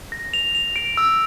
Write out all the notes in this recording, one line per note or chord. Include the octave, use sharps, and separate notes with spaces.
A#6
F7
F7
D7
E6